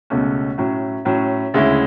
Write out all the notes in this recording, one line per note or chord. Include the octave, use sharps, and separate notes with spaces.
C#2 B2 A3 C#4
A2 F#3 C#4
A2 F#3 C#4
D2 C#3 G#3 C#4 E4